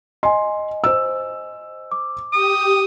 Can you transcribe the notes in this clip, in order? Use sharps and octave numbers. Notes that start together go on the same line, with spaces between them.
D#5 G#5 C6
C5 E6
D6
G4 D#6